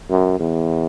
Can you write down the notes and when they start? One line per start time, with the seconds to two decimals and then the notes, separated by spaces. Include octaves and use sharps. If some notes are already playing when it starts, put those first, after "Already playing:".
0.10 F#2
0.40 E2